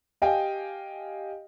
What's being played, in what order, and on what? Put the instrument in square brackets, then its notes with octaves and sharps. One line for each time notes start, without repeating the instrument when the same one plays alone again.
[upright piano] G4 D#5 F5 G5 G#5